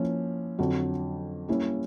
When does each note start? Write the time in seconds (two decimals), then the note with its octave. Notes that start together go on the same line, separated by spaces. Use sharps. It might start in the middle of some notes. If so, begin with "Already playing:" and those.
Already playing: F3 A#3 C#4 E4
0.59 F2 D3 F#3
1.48 G3 A#3 C#4 E4 G4